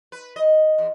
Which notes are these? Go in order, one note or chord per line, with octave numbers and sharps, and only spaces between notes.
B4
D#5
E2